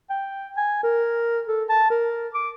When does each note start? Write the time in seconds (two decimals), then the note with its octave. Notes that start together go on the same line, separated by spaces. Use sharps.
0.10 G5
0.57 G#5
0.83 A#4
1.48 A4
1.69 A5
1.90 A#4
2.34 D6